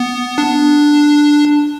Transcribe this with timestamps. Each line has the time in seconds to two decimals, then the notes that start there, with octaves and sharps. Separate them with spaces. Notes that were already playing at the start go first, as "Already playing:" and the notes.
Already playing: B3
0.38 D4